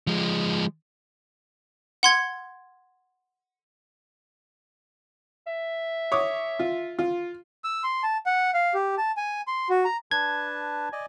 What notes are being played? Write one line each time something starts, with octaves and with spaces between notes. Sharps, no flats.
F3 G#3
F#5 C6 G#6
E5
C#5 D6 D#6
F4
F4
E6
C6
A5
F#5
F5
G4
A5
G#5
C6
F#4
A#5
D4 B4 A5 G#6
D5 D#5 G#5